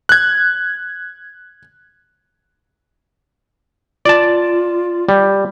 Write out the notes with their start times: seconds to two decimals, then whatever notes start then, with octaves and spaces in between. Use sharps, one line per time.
0.09 F#6 G#6
4.06 F4 D5 A5
5.09 G3